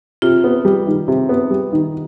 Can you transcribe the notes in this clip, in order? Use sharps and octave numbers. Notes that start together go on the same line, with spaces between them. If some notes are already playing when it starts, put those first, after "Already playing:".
C3 F4
B3
G3
D#3
C3
B3
G3
D#3